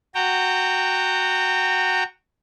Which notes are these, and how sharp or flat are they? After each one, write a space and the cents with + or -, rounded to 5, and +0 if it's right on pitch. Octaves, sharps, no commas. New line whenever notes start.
F#4 +0 G5 +0 A#5 -25